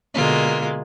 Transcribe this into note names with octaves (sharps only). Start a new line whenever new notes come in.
B2 D3 G#3 A#3 F4